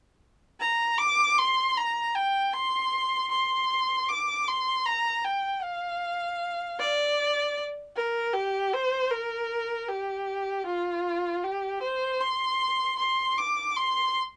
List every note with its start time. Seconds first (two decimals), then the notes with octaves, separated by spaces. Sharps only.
0.60 A#5
0.98 D6
1.38 C6
1.77 A#5
2.15 G5
2.53 C6
3.31 C6
4.08 D6
4.47 C6
4.86 A#5
5.24 G5
5.63 F5
6.79 D5
7.96 A#4
8.34 G4
8.73 C5
9.11 A#4
9.89 G4
10.66 F4
11.43 G4
11.82 C5
12.21 C6
12.99 C6
13.37 D6
13.76 C6